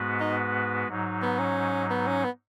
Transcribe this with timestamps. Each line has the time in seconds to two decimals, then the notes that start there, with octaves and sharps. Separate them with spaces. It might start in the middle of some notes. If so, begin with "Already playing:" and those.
Already playing: G#2 G#3 B3 F#4 B4
0.21 D#4
0.88 G#2 F#3 D#4
1.22 B3
1.39 C#4
1.90 B3
2.07 C#4
2.24 B3